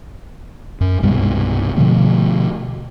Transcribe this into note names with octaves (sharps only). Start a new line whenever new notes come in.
F#2
C2 G2 B2 G#3
B2 D3 F3 A3